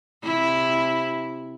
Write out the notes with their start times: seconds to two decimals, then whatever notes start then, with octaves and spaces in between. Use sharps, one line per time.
0.24 C3 E4